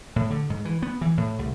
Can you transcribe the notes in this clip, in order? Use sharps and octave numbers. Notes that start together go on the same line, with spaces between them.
A2
D3
G#2
E3
B3
E3
A2
C2